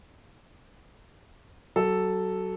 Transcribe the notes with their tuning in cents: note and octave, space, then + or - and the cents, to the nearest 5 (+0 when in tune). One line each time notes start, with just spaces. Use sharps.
F#3 +25 A4 +0